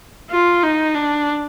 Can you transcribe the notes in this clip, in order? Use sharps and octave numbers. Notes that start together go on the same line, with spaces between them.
F4
D#4
D4